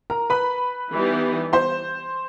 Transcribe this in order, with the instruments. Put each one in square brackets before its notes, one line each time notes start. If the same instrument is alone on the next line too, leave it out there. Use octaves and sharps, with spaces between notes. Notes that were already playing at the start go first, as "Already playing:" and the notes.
[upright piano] A#4 A#5
B4 B5
[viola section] E3 G3 B3 D#4 G4
[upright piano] C5 C6